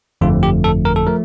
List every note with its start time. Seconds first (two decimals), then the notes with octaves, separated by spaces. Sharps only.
0.21 G1 F2 D3 F3 A3 F4
0.43 G4
0.64 A4
0.85 A#4
0.96 A4
1.07 F3 A3 A#4